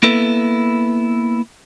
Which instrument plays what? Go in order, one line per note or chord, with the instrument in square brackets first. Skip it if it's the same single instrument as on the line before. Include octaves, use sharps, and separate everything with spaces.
[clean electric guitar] A#3 B3 E4 A4 B4